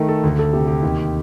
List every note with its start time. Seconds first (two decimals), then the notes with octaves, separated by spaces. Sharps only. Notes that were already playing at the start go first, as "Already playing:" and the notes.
Already playing: D#3 A3
0.09 A4
0.24 D2
0.39 A4
0.53 C3 G4
0.67 G4
0.83 D#2